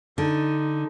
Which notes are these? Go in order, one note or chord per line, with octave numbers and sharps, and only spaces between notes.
D3 D#4